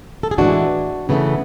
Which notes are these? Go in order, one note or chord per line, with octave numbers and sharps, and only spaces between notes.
A4
G#4
A2 E3 G#3 D4 F#4
C#3 E3 A3 B3